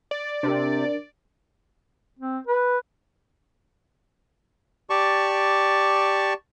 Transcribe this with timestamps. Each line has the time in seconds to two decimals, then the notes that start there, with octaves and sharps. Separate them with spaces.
0.11 D5
0.43 C3 D4 A#4
2.19 C4
2.47 B4
4.90 G4 D5 A5 C#6